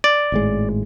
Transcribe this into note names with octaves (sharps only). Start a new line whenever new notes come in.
D5
G#1 A2 G#3